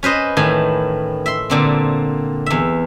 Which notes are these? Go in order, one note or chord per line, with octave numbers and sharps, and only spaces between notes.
C#4 B4 C5 D#5
A2 D#3 E3 G#5
E5 C6
A#2 D3 C4
E2 E5